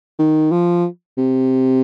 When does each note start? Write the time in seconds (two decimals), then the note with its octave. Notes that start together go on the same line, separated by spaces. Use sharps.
0.19 D#3
0.52 F3
1.18 C3